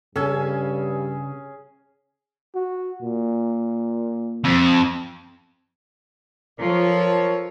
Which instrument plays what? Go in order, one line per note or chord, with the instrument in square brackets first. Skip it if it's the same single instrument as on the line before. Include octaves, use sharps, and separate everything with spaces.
[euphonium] G2 [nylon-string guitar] C#3 [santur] C#4 G#4 G#5 [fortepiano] A4
[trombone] F#4
A#2
[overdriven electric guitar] F2
[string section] F3 [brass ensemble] A4 A#4 C#5